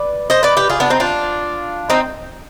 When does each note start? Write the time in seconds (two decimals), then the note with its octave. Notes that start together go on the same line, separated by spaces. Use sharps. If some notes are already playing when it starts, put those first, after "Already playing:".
Already playing: B4 D5
0.30 C5 D#5
0.43 B4 D5
0.57 G4 B4
0.70 F4 G#4
0.80 B3 D4
0.90 C4 D#4
1.00 D4 F4
1.90 C4 D#4